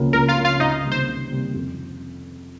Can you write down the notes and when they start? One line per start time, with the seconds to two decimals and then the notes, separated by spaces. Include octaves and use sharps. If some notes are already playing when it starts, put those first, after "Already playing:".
Already playing: C#2 C#3 F3 A#3 C#4
0.13 C#2 A#4
0.28 F4 F5
0.36 C#3 F3 A#3 C#4
0.45 F4 F5
0.60 C#2 D#4 D#5
0.83 C3 D#3 G3 A#3
0.92 C5
1.07 C#2
1.30 C3 D#3 G3 A#3
1.54 F2